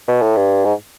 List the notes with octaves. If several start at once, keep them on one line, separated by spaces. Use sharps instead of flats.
B2
A2
G2
G#2